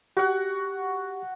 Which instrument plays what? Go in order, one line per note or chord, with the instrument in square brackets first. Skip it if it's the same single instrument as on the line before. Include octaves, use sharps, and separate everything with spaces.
[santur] F#4 F#5 [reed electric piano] G4